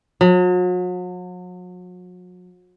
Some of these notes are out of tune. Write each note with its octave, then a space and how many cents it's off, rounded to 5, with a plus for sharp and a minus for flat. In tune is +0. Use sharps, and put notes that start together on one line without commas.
F#3 -40